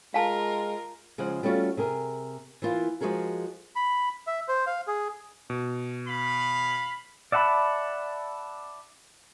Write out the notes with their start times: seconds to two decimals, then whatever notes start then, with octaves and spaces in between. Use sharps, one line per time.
0.14 G#3 F4 A#4 F5 A5
1.18 C#3 F3 G#3 F#5
1.43 G3 A3 C#4 F4 F#4
1.77 C3 G#4 A#4
2.62 E3 A#3 F4
3.01 F3 G#3 F#4 G#4 A#4
3.76 B5
4.27 E5
4.48 C5
4.67 F5
4.87 G#4
5.50 B2
6.07 F5 B5
7.32 D5 E5 F#5 A5 B5